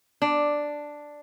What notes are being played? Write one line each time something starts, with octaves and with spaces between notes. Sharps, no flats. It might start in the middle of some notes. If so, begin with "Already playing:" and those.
D4